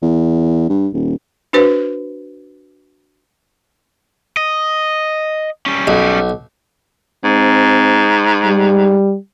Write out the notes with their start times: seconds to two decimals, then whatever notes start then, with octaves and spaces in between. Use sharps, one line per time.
0.02 E2
0.69 G2
0.94 D#1
1.53 D4 F#4 B4 C5
4.37 D#5
5.66 G3 C#4
5.87 B1
7.24 G#2 C4
8.45 G3